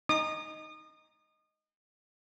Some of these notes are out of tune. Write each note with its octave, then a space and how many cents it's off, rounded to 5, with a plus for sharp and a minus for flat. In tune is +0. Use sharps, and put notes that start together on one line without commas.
D#4 +0 D#6 -30